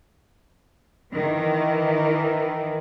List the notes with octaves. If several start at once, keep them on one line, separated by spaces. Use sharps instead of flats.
D#3 E3